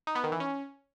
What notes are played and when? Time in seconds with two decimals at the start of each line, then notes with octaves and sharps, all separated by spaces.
0.07 D#4
0.15 B3
0.24 D#3
0.32 E3
0.40 C#4